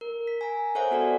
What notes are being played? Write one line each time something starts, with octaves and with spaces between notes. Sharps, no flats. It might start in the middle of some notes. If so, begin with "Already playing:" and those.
A#4
B6
G#5 A#5
A4 C5 C#5 E5 F#5 G#5
B3 F#4 A4 D5 F#5